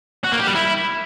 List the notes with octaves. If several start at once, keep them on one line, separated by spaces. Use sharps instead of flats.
F#4
A#3
G4
G3
E4